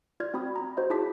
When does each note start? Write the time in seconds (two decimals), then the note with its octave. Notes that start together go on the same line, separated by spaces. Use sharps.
0.20 F4 D5 F6 G#6
0.34 C4 F#4 B5 D#6
0.56 A#5 B5
0.77 F#4 C5 C#5 D#5
0.90 E4 F4 G#4 A5 D6 B6